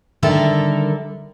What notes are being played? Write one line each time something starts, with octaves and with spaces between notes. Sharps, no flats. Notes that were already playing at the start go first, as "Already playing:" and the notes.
D3 D#3 G3 A4 A#4 E5